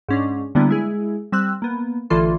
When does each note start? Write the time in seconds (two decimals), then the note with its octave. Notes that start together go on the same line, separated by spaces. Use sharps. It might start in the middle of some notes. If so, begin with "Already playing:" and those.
0.09 G#2 C#4 D4
0.55 D3 G3 A#3 B3 D4 E4
0.69 G#3 E4 G#4
1.32 G3 C4 E6 F#6
1.62 A#3 B3
2.10 A1 D3 E3 F4 A4 C6